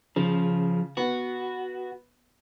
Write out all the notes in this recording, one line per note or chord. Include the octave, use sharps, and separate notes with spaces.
C#3 F3
B3 F#4